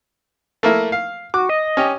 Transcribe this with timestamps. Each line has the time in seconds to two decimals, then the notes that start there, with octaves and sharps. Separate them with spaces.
0.63 A3 A#3 E4
0.92 F5
1.34 F#4 D6
1.49 D#5
1.77 C#4 G4